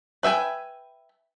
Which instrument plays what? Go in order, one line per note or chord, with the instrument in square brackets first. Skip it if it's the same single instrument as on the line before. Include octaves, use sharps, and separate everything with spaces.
[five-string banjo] B4 E5 G5 G#5